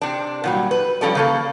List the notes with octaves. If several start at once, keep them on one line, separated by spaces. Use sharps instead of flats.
C3 D4
A#2 F#3 G3
B4
F3 G3 C#4 A4 D5
C#3 A#3 A4